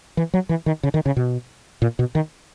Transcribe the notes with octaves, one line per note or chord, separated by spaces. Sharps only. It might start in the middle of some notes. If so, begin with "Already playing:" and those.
E3
F#3
E3
D#3
C#3
D#3
C#3
B2
A#2
B2
D#3